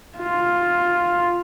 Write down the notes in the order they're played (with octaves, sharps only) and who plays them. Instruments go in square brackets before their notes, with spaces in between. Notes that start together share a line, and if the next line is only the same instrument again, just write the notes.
[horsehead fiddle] F4